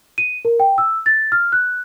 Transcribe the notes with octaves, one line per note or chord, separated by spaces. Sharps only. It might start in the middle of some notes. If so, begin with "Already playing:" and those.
D#7
A#4
G5
E6
A6
F6
F#6